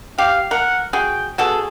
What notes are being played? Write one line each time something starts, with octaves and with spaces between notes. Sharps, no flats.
G4 F5
A#4 F#5
F#4 G#4 G5
B2 F#4 G#4 A4